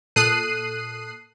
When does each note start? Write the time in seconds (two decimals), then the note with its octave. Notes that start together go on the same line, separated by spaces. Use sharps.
0.16 A#2 A4 D#6 F#6 C7 D#7